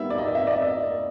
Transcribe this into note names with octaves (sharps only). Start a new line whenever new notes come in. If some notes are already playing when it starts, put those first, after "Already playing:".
Already playing: D#3 G3 B3 E5
D5
D#5
E5
D5
D#5